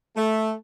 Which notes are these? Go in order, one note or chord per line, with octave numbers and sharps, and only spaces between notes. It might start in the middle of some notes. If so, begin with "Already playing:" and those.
A3